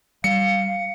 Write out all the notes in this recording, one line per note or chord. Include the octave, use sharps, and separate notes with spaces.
G3 F5 C#7